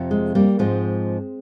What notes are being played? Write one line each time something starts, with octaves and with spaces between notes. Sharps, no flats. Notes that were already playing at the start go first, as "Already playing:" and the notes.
Already playing: F2 C3 F3
G#3
G3 A#3
G#2 F3 G#3 C4